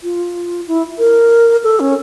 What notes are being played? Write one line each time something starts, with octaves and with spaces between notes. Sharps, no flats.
F4
E4
A#4
A4
C#4